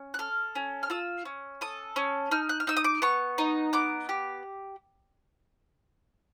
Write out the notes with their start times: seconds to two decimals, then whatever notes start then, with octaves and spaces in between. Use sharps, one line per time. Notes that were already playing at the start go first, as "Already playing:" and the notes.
Already playing: C#4
0.14 F#6
0.19 A4 F6
0.55 C#4
0.83 F6
0.90 F4 E6
1.25 C#4
1.61 A4 D#6
1.96 C#4
2.31 D#4 F6
2.49 F#6
2.60 F6
2.67 D#4 E6
2.77 D#6
2.84 D6
3.02 B3 C#6
3.38 D#4
3.73 B3 D6
4.09 G4